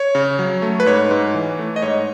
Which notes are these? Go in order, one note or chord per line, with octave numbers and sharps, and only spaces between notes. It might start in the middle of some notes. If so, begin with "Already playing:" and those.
Already playing: C#5
C#3
F#3
A3
B4
G#2 C#5
G#2
E3
A3
D#5
G#2 C#5